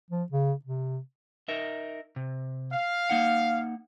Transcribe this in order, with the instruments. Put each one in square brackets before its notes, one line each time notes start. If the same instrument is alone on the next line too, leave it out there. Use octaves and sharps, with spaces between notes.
[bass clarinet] F3
C#3
C3
[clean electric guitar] D#4 A#4 E5
C3
[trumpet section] F5
[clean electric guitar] A#3 D#4 F#5